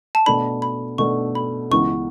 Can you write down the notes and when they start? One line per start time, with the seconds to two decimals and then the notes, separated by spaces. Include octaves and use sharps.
0.15 A5
0.26 B2 A3 D4 B5
0.62 B5
0.98 B2 A3 D4 C#6
1.35 B5
1.71 C#2 C#3 E3 B3 C#6